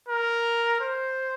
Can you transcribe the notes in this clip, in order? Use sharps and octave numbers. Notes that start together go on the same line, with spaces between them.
A#4
C5